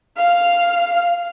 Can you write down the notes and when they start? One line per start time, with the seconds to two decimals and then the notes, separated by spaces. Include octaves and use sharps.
0.16 F5 F6